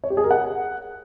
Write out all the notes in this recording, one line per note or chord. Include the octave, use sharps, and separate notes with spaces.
C#5
G4
G#4
A#4
F#5